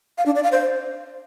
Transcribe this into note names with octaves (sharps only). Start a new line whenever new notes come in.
F5
D4
D5
F5
C5